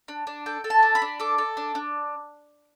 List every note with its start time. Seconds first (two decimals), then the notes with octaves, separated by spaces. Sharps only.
0.08 D4
0.27 D4
0.46 A4 G5
0.64 A4
0.70 A5
0.83 D4
0.95 B5
1.02 D4
1.20 A4 D6
1.38 A4
1.57 D4
1.75 D4